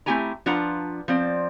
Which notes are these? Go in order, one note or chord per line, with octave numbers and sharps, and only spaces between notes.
A3 C4 E4 G4 G#5 A#5
F3 D4 F4 B4 F#5 A#5
F3 C4 D5